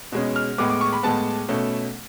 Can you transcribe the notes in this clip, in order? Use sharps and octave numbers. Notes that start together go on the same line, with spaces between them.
B2 G#3 C#4
F6
A2 G#3 B3 D6
D6
C#6
B5
A2 G#3 B3 A5
B2 A3 C#4